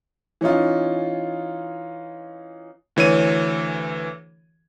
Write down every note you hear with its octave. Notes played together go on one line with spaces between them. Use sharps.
E3 C#4 D#4 F4
D2 E3 C#5 D#7